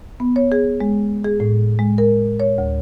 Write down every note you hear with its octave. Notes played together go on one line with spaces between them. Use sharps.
B3
C#5
G#4
G#3
G#4
A2
G#3
A#4
C#5
D2